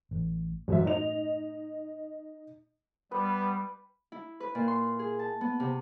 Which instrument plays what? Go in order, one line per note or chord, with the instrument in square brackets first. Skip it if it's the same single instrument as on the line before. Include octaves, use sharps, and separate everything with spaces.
[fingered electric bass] A1
[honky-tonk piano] A1 F#2 E5 [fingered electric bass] A2 A3
[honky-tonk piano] D#4 D#5 F7
[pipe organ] G3 [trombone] B3 [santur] B4
[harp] E4
B4
A#2
C6
G#4
A5
B3
C3